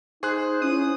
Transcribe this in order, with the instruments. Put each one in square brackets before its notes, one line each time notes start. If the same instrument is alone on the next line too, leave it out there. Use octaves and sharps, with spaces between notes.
[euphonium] D#4 [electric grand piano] G#4 F#6 [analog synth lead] C5
[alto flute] C#4 [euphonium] E4 [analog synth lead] D#6